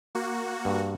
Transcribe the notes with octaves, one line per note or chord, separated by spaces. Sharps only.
A#3 F#4
G2